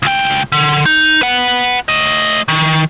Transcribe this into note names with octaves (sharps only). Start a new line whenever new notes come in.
C#2 G5
D3
D#4
B4 F#5
A3 D#5
D#3